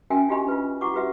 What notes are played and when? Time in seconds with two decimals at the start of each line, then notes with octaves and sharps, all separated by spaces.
0.10 C#4 F#4 A#4 E5 G5 G#5
0.29 D4 F4 G4 D#5 B5 C#6
0.48 F4 B4
0.81 E4 F#4 F#5 C#6 D6
0.94 F#4 G4 B4 E5 F#5